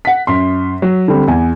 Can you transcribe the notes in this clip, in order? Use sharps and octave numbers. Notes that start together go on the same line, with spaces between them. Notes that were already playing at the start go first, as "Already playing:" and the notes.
F#5 B6
F#2 C6
F#3
D3 G3 C4
E2 G#5